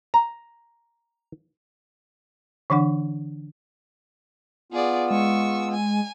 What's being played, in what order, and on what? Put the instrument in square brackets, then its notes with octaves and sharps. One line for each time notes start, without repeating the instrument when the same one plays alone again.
[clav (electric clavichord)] A#5
[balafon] D3 E3 D4 F#5
[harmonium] B3 F4 [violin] G#4 D5
[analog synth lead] G#3 [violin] C#6 E6
[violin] G#5